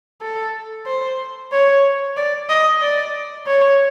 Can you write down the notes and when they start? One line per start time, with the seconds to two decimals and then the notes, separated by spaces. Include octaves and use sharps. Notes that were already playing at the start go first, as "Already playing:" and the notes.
0.22 A4
0.86 C5
1.52 C#5
2.17 D5
2.49 D#5
2.82 D5
3.47 C#5